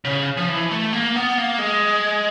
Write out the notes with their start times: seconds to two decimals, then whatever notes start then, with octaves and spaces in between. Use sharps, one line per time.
0.05 C#3
0.37 F3
0.49 E3
0.71 A3
0.93 A#3
1.16 B3
1.38 A#3
1.59 G#3